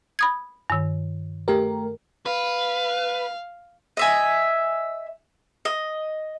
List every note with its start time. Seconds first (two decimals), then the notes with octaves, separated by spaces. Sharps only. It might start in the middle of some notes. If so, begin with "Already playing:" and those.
0.19 B5 D#6 G#6
0.70 G2 D#3
1.48 A3 G4 A#4
2.26 B4 F5
3.97 D#5 E5 G#5
5.65 D#5